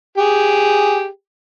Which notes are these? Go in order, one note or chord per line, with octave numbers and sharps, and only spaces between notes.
G4 G#4